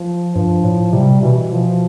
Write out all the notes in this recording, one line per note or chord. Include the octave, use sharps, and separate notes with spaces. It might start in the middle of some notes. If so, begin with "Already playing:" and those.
Already playing: F3
G2 F3
A2
C3 G3
B2 E3
F3